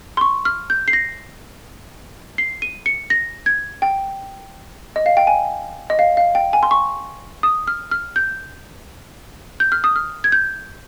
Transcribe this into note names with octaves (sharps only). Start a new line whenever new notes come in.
C6
C#6
F6
G6
C7
A#6
C7
D#7
C#7
A#6
G#6
G5
D#5
F5
G5
G#5
D#5
F5
F5
G5
G#5
C6
C#6
D#6
F6
F6
G6
G6
F6
D#6
F6
G#6
G6